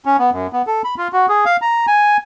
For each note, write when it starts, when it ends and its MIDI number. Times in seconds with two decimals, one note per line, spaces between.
0.05 0.17 61
0.18 0.30 59
0.32 0.47 42
0.53 0.62 59
0.67 0.82 69
0.84 0.95 83
0.98 1.08 65
1.13 1.26 66
1.29 1.45 68
1.46 1.57 77
1.62 1.86 82
1.88 2.17 80